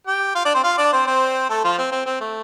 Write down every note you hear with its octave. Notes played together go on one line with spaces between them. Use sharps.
G4 G5
F4 F5
D4 D5
C4 C5
F4 F5
D4 D5
C4 C5
C4 C5
A3 A4
F3 F4
C4
C4
C4
A3